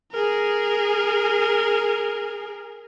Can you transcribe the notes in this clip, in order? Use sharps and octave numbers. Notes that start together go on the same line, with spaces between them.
G#4 A#4